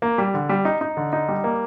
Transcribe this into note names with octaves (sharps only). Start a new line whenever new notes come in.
A#3
G3
D3
G3
D#4
D#4
D3
D#4
G3
A#3